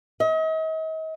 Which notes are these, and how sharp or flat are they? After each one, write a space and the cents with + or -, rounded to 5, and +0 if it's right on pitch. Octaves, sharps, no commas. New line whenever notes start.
D#5 +40